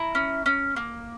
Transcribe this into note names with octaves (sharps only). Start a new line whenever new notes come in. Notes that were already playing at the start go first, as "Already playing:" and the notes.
Already playing: E4 A#5
C#4
C#4
A#3